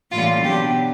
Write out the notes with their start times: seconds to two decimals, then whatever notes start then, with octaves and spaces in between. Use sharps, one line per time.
0.11 A2 E3 G3 A#3 C#4 F4
0.43 B2 F#3 B3 D4 G4